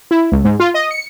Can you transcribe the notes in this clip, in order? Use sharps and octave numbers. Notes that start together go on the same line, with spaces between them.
E4
C#2
G#2
F4
D#5
C#7